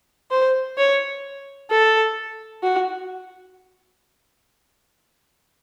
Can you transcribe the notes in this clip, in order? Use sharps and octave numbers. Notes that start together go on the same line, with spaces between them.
C5
C#5
A4
F#4